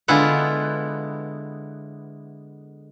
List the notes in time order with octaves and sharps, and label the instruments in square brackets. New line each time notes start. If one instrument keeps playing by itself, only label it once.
[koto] D3 G#3 B3 E4 F4 F#5